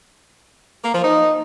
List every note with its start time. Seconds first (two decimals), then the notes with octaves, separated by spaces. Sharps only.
0.84 A#3
0.93 F3
1.03 D#4